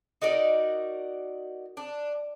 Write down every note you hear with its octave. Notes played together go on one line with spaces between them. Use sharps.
D#4 F#4 A#4 D5
D4